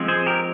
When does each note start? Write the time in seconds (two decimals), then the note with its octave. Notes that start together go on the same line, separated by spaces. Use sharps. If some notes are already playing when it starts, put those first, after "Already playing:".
Already playing: F3 G#3 C4
0.08 G#4 C5
0.26 G4 A#4